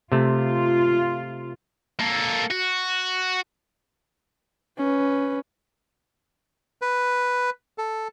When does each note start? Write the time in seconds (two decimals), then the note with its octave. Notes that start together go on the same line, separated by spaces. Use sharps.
0.12 C3 A3 F4
1.99 A#3 A4
2.51 F#4
4.77 C#4 B4
6.82 B4
7.78 A4